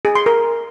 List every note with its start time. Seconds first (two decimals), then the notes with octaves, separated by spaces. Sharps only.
0.05 G#4
0.15 C6
0.26 A#4